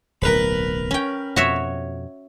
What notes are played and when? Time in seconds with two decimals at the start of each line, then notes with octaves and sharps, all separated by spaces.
0.22 D1 B1 A#4 B4 B5
0.91 C#4 G5
1.36 F2 B2 F#4 C#5 E5